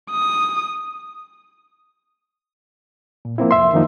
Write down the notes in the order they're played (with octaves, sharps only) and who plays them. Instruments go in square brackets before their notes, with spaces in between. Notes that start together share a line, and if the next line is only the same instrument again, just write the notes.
[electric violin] D#6
[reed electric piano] A#2
F3 A#3 C4 E4
C2 F2 E5 C6
F#2 D#3 F3 A#3 D#4